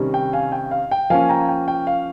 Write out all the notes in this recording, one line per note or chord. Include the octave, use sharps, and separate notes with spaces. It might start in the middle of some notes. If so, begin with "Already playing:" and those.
Already playing: C3 D#3 G3 C#4
G5
F5 G#5
G5
F5
G5
F3 A#3 C#4 F5 G#5
G5 A#5
G5
G5
F5